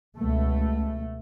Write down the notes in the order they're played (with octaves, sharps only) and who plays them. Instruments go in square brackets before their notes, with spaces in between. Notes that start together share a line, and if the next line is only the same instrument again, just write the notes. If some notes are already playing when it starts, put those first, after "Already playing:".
[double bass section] C#2 B2 A3